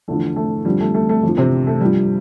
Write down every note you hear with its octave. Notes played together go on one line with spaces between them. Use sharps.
E2 D3 F3 A3
A3
F2 D3 F3 G3
A3
A3
A3
F2 D3 F3
C3 C4
A3
G2 F3 G3